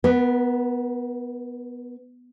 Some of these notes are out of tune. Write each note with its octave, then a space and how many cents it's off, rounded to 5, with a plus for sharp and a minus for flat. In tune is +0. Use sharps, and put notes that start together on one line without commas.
B3 +0 A#4 +45